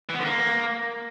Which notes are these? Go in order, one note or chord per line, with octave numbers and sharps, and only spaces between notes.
E3
B3
D3
A#3